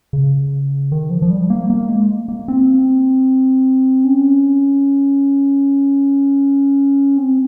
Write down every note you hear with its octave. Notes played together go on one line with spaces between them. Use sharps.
C#3
D#3
F3
F3
G3
A#3
A#3
G#3
A#3
C4
C#4
C4